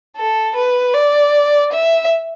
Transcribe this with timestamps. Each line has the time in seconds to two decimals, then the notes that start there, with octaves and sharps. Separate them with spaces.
0.16 A4
0.56 B4
0.94 D5
1.72 E5